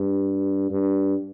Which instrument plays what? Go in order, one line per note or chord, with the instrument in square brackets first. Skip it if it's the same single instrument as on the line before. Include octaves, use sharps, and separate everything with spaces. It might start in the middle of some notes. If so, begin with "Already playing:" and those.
Already playing: [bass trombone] G2
G2